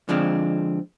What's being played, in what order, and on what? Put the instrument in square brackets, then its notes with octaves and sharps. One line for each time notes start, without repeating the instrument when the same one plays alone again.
[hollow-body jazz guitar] D3 F3 G#3 C4